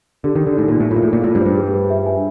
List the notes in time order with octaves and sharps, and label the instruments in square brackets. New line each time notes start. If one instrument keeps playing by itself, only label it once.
[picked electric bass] D3 [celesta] G4
[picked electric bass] D#3
[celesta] D#4
[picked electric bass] D3
[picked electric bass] A2 [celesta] D#4
[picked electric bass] A#2
[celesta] D#4
[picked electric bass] A2
[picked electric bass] A2 [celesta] F4
[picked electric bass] A#2
[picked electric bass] A2 [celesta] G#4
[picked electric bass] A#2
[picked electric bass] A2 [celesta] F4
[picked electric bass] G2
[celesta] C5
[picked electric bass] G2
[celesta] G#4
B4
E5
G#5